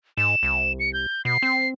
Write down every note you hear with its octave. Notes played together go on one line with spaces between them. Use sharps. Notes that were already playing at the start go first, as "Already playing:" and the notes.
G#2 E7
C2
C#7
G6
B2 C7
C4